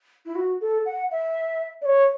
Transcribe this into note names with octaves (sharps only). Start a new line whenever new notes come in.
E4
F#4
A4
F#5
E5
D5
C#5